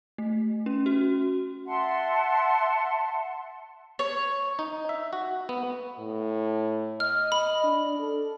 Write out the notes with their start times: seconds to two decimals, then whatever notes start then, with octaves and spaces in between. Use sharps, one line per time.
0.18 A3
0.66 C#4
0.86 F#4
1.67 E5 F#5 A5 C6
3.99 C#5
4.59 D#4
4.89 E5
5.13 F#4
5.49 B3
5.99 A2
7.00 D#5 F6
7.32 B5
7.64 D4
7.99 A4